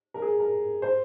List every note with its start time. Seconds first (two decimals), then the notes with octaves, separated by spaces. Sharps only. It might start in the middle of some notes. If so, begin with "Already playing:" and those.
0.14 A#4
0.22 G#4
0.39 A#4
0.82 C5